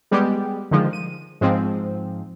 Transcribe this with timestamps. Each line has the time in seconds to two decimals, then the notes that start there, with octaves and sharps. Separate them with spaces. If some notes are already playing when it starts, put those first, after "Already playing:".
0.11 G3 G#3 B3 G4
0.71 D3 D#3 F3 G#3
0.93 D#7
1.41 G#2 F3 C4